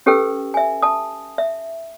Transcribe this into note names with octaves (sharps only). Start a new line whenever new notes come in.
C#4 G4 A4 B4 G5 E6
E5 G#5
A5 D#6
E5